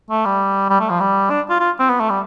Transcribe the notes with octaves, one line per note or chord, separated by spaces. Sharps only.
A3
G3
G3
A3
F3
G3
D4
F4
F4
C4
B3
A3
G3